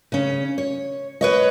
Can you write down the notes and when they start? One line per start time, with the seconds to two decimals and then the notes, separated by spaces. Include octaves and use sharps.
0.12 C#3 C#4
0.58 C#5
1.21 B4 C#5 D#5